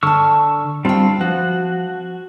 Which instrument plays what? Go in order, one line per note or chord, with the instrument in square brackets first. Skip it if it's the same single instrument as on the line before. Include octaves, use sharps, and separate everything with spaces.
[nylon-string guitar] D3 A5 [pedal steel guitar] C#6 E6 F6
[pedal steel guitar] G3 C4 F4 [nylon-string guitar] D4 G5
[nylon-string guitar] F3 [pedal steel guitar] F#4